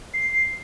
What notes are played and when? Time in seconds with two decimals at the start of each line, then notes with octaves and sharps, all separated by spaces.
0.13 C7